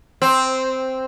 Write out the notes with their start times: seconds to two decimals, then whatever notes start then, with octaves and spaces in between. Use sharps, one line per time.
0.22 C4